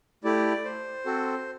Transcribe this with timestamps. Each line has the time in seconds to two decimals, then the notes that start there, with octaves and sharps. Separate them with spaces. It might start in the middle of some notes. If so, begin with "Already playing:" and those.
0.24 A3 E4 G4 D5
0.65 C5
1.05 C4 F#4 A4